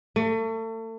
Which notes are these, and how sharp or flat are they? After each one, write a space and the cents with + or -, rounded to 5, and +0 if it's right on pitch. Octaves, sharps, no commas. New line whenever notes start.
A3 +35